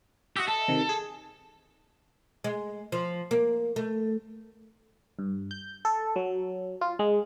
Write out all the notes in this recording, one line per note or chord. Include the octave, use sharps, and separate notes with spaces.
F#4 G4 D#5 E5
A4
C3 D#3
G#4
G#3
F3
A#3
A3
G2
G6
A4
F#3
F4
G#3